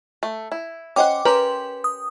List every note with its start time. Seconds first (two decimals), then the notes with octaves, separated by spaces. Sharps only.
0.23 A3
0.52 E4
0.96 C#4 C5 D#5 F#5 G5 D6
1.25 C#4 G4 A#4 B4 C6
1.84 D#6